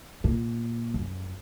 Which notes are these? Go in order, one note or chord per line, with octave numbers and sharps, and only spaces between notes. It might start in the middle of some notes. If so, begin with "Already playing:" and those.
A#2
F#2